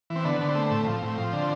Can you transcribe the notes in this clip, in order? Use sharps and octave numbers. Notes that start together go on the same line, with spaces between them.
E3
C4
D3 B3
D3
C4
A3
A2
F3
A2
F3
D3